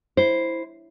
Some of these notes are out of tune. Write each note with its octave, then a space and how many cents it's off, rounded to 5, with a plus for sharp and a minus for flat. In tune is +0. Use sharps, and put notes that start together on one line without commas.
E4 +0 C5 +0